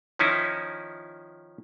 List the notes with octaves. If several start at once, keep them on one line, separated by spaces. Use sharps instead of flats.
D#3 F3 C#4 D#4 E4